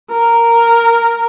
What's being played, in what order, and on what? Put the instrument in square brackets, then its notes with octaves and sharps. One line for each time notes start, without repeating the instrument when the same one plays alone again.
[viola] A#4